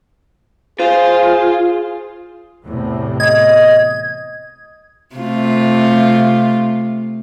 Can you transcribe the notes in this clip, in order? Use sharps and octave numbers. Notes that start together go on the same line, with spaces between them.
F4 G#4 C5
E2 A2 C3
D#5 G#6
C3 A3 F4